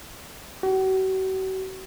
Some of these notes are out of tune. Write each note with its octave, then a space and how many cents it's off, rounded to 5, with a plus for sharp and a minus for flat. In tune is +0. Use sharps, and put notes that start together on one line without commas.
F#4 +40